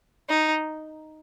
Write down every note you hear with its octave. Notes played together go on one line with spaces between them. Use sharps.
D#4